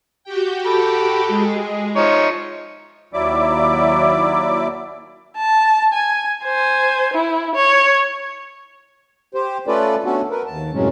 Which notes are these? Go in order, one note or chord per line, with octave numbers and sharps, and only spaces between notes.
F#4 G4 G5
A4 B5
G#3 G#4
F3 D#4 C#5 E5
D#2 F#3 E4 D5 E5 D6
A5
G#5
C5 G#5
E4
C#5
G4 C5
A3 C#4 F4 A4 B4 D5
A3 B3 C#4 D4 F#4 A4
A#4 B4
D#2 A5
F#2 A2 C3 F#3 G#3 C#4